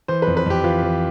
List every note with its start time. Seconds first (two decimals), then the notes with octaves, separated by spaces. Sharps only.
0.08 E3 C5
0.22 F2 B4
0.37 B4
0.46 F2 G4
0.64 E3 F4
0.83 E3